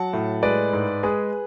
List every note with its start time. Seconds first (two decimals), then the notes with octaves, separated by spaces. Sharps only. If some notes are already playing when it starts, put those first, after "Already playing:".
Already playing: F#3 F#5 A5
0.13 A2
0.43 G#3 B4 D5
0.73 G#2
1.03 G#3 G#4 B4